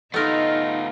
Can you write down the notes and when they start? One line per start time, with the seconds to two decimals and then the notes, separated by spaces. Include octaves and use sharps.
0.14 A3 B3 D#4 F4 A#4 D#5